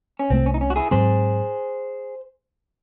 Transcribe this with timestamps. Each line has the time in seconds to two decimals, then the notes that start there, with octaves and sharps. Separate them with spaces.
0.19 C#4
0.30 C2 C3 E3 A3 C4
0.46 C#4
0.54 D#4
0.61 C#4
0.70 F#4
0.76 E4 G#4
0.91 G#2 F#3 C4 G#4 C5